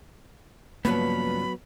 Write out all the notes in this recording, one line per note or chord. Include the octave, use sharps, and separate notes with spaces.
G2 C#3 F3 F#3 A#3 B3 B5